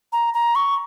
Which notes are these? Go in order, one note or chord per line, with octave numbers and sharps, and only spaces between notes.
A#5
A#5
C#6